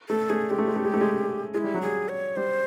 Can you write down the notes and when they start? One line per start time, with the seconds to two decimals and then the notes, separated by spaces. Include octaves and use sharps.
0.09 A3 A4
0.30 A3 G#4
0.50 G#3 G4
0.59 A3
0.68 G#3
0.76 A3
0.85 G#3
0.94 A3
1.01 G#3
1.54 G#3 E4 F4
1.64 G3
1.74 F#3
1.82 G3 G#4
2.09 C#5
2.36 G3 C5